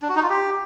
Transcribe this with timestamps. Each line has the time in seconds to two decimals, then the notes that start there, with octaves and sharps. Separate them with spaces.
0.02 D4
0.09 F#4
0.16 D#4
0.23 F4
0.30 G4